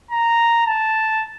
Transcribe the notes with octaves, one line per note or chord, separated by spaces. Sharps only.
A#5
A5